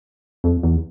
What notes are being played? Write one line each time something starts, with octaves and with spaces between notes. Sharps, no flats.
F2
E2